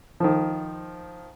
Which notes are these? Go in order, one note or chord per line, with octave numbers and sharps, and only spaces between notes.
D#3 F3